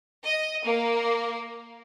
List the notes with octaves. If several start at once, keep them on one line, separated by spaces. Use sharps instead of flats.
D#5
A#3